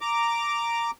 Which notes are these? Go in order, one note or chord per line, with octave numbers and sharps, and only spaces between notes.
A#5 D6